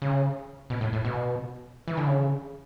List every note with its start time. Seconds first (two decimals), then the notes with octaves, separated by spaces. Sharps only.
0.02 C#3
0.70 B2
0.81 A2
0.93 A2
1.05 B2
1.88 E3
1.97 D3
2.07 C#3